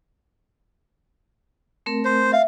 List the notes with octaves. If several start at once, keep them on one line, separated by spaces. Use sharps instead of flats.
A3 C4 A#4
C5
E5 F5